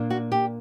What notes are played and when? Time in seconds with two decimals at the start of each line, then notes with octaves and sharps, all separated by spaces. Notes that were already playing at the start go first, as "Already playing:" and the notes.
Already playing: A#2 A#3 D4
0.10 F#4
0.32 G4